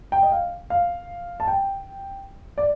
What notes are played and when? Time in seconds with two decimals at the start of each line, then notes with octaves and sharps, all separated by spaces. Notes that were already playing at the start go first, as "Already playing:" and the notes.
0.12 G5
0.23 D#5
0.32 F5
0.70 F5
1.40 A5
1.48 G5
2.58 D5